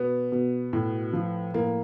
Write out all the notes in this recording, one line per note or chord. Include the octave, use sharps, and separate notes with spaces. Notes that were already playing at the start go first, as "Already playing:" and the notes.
Already playing: B2 B3
B2
A2
F3
A2 A#3